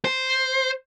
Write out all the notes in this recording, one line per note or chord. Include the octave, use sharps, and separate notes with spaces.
C5